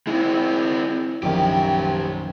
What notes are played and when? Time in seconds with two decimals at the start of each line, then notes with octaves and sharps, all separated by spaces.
0.07 G#3 C4 E4
1.23 A#1 F#2 D#3 C#4 G4